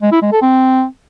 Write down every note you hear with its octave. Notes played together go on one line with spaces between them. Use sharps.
G#3
E4
G#3
A4
C4